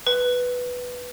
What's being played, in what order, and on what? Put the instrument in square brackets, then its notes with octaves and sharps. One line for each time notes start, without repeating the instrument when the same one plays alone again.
[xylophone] B4